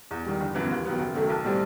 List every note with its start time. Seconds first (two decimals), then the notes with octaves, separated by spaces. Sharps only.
0.11 E2
0.25 D#3 G3
0.40 G1
0.55 F#2 E3 B3
0.70 D#2
0.85 D#3 F#3 B3
1.00 F#1
1.14 F#2 D#3 F#3 A3
1.30 B1
1.44 A2 G3 C4